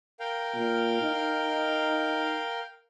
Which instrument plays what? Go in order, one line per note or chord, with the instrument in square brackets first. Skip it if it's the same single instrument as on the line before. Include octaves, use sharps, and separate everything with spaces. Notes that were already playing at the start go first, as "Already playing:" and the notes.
[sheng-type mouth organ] A#4 F5 G5
[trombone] A#2
D#4